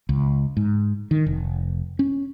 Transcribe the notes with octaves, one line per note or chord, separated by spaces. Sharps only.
C#2
G#2
D#3
F1
C#4